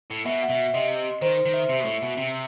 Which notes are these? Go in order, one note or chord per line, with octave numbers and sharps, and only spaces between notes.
A2
B2 E5
F#5
B2 E5
C3 D#5
D#3 C5
C5
D#3
E5
C3 E5
B2
A2
B2
C3